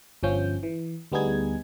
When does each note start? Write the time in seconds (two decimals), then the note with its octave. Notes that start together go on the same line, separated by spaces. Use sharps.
0.23 G1 G2 F3 C#4 G6
0.63 E3
1.12 D2 G3 B3 D#4 G#4 G#6